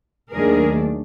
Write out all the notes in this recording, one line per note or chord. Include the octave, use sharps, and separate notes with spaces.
D#2 D#3 F#3 A3 D4 G#4 A#4